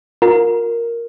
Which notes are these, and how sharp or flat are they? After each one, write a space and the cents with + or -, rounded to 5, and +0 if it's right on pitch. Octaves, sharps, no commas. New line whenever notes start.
F4 +35 A#4 +0